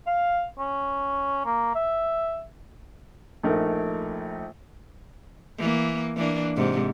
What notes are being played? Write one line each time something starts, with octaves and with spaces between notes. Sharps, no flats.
F5
C#4
A#3
E5
A#1 A3 D#4 A#4
E3 A#3
E3 A#3 D4
G#2 C3